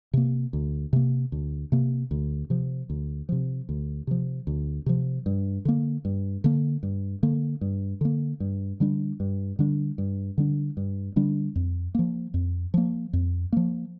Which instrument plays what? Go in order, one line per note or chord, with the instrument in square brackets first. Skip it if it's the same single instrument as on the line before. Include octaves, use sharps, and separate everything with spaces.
[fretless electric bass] C3 A#3
D2
C3 A#3
D2
C3 A#3
D2
C3 F3
D2
C3 F3
D2
C3 F3
D2
C3 F3
G2
D3 A#3
G2
D3 A#3
G2
D3 A#3
G2
D3 A#3
G2
D3 G3 D4
G2
D3 G3 D4
G2
D3 G3 D4
G2
D3 G3 D4
F2
F3 A#3
F2
F3 A#3
F2
F3 A#3